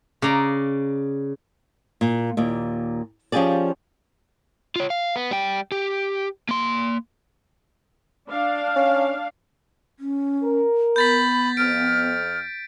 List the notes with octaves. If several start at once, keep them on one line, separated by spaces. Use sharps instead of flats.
C#3 D5 A#5
A#2
D#2 A#2
F3 C#4 F4 G4 G#4 D5
F4 C#5
F5
B3
G3 G5
G4
A#3 C6
D4 F5
C#4
C#4
A#4
B3 B5 G6 A6 B6
F2 F6 D7